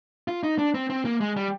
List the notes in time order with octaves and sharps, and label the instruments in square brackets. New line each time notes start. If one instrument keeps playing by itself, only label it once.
[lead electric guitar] F4
D#4
D4
C4
C4
A#3
G#3
G3